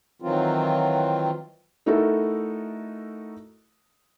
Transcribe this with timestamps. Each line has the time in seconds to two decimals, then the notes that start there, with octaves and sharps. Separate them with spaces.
0.22 D#3 E3 F#3 C4 F4
1.86 A3 D#4 E4 F#4 A4 A#4